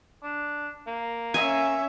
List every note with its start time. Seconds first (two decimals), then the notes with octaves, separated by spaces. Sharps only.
0.24 D4
0.88 A#3
1.34 C#4 E5 G#5